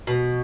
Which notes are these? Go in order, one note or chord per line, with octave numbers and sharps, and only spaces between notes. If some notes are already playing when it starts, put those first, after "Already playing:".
B2